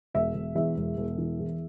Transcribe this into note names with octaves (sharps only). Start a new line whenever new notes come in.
E1 E5
E1
E2 E5
E1
E1
E3
E2